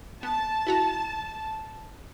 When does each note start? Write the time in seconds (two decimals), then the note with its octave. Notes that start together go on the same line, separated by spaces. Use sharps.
0.23 B3 A5
0.67 E4 F#4 A#5